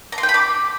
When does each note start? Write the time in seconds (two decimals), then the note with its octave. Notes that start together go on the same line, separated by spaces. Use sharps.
0.12 A#5
0.18 C6
0.23 G5
0.29 B5
0.34 D6